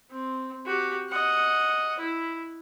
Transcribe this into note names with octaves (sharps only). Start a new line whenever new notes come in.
C4
F#4 G4
D#5 F#5
E4